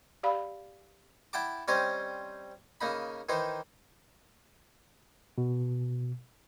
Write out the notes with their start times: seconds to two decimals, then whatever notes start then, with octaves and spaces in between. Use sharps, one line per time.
0.23 G4 D5 F5 B5
1.33 E4 F#5 G5 A5 D6
1.68 G3 C4 C#4 C5 C#5 D#5
2.81 C#3 A#3 D#4 B5
3.29 D#3 E3 D#4 C5
5.38 B2